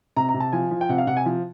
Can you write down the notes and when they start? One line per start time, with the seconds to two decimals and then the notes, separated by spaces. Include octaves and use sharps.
0.16 C3 A#5
0.29 A#5
0.34 C3
0.40 A5
0.52 F3 G#5
0.71 F3
0.81 G5
0.89 C3 F#5
0.98 F5
1.07 C3 F#5
1.17 G#5
1.26 F3